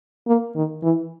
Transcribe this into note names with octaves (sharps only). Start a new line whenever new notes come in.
A#3
D#3
E3